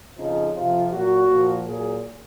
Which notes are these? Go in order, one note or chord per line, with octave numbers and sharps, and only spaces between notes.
F2 C#3 F3 D#4
F2 C3 F3 F4
A#2 F#3 F#4
A#2 F3
A#2 F#3 G#4